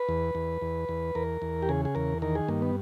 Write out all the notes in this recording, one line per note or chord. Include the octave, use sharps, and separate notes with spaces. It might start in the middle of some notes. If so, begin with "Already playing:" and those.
Already playing: B4
E2
E2
E2
E2
E2 A#4
E2
G4
C#3 G#4
G#4
E2 A#4
D#3 A#4
G#4
G2 A#3
B3